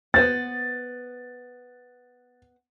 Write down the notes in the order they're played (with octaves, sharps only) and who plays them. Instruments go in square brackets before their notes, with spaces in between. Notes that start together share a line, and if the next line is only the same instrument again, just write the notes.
[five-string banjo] B3 C5 F#5 [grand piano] A6